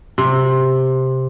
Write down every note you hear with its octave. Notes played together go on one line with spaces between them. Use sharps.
C3